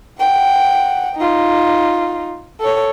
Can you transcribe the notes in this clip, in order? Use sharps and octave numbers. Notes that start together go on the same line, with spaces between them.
F#5 G5
D#4 F4
A4 C#5